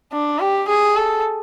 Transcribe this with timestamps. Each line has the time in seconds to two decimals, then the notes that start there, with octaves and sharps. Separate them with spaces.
0.12 D4
0.40 G4
0.68 G#4
0.96 A4